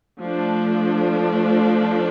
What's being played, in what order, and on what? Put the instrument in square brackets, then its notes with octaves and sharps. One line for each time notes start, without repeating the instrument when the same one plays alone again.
[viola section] F3 A3 D4